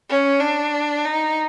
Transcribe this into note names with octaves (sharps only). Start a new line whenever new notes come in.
C#4
D4
D#4